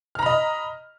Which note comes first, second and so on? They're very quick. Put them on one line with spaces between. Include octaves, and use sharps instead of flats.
F6 A#5 B5 D#5